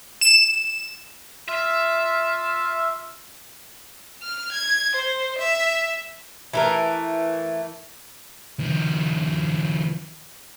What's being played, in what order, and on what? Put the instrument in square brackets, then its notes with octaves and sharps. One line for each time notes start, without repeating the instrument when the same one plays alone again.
[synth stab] E7
[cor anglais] F4 [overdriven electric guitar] E5
[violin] F6
G#6
C5
E5
[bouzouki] E3 A3 A#4
[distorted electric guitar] D#3 F3